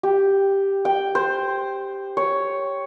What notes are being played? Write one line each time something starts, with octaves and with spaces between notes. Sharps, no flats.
G4
G5
C5
C#5